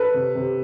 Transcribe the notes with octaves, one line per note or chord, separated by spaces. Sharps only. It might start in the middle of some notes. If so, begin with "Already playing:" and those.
Already playing: A4 B4
C3
C3